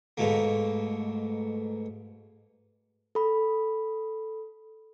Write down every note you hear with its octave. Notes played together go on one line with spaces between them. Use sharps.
G#2 B2 A3 A#3
A4 B5